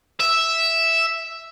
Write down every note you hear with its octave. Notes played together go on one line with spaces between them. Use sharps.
E5